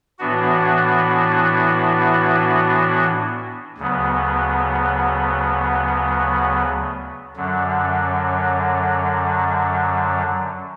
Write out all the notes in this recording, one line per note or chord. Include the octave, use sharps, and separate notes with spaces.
A2 E3 B3 D4 F#4
D2 C#3 F#3 B3
F#2 D3 F#3